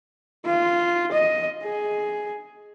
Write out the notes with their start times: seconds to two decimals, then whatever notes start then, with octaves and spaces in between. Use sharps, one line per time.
0.46 F4
1.13 D#5
1.63 G#4